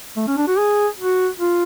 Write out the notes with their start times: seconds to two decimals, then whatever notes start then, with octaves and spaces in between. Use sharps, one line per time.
0.17 A3
0.28 C#4
0.37 D4
0.48 F#4
0.58 G#4
0.99 F#4
1.40 F4